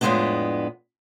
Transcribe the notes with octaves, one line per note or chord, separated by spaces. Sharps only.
F2 A2 F#3 G#3 B3 D4